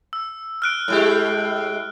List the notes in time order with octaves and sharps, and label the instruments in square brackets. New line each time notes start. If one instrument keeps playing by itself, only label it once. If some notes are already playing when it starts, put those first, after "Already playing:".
[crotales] E6
F6 F#6 D7
[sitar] A2 G#3 G4